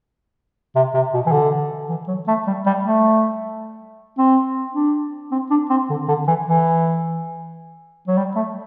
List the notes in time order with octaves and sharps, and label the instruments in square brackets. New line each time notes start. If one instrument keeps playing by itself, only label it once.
[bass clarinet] C3
C3
B2
E3
D3
E3
F#3
A3
G3
G3
A3
C4
D4
C4
D4
C4
D3
D3
E3
E3
F#3
G3
A3